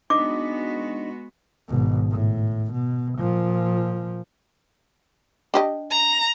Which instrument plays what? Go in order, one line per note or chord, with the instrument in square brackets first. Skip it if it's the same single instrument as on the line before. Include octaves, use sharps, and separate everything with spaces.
[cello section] G#3 B3 F#4 [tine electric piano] D4 D#4 D#5 [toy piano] D6
[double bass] G#1 B2
A2
B2
A#2 F3
[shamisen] D4 G4 D#5
[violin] A#5